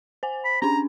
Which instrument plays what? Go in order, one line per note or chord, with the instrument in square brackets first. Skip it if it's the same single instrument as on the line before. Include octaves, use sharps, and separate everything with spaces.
[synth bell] C5 G#5
[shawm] B5
[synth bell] C#4 D4 [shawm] A#5